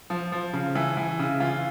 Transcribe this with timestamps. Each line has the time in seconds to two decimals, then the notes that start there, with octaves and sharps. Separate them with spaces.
0.10 F3
0.32 F3
0.53 C#3
0.75 E3
0.97 E3
1.19 C#3
1.40 E3 F4